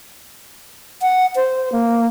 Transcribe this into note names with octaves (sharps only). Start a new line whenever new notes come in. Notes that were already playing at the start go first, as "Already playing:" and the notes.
F#5
C5
A#3